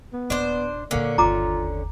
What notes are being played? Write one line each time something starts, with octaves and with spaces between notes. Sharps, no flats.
B3
D#1 D4 C5
A#2 D3 F#3 A#3 C#4
G1 D#2 F4 A#5 D6